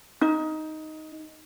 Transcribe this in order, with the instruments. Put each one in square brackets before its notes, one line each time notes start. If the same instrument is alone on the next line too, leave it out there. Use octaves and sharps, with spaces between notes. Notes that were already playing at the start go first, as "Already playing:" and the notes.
[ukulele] D#4